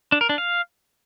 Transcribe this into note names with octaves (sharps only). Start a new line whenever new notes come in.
D4
A#4
D4
F5